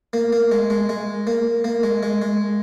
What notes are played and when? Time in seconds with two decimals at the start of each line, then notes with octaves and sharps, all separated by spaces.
0.13 A#3
0.32 A#3
0.52 G#3
0.70 G#3
0.89 G#3
1.27 A#3
1.64 A#3
1.83 G#3
2.03 G#3
2.22 G#3